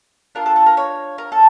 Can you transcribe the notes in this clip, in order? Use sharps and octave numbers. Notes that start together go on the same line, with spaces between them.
D4 F4 A4 A#4
A4
A4
A#4
C#5
A#4
A4